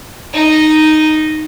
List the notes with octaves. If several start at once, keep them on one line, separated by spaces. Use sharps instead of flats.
D#4 D#5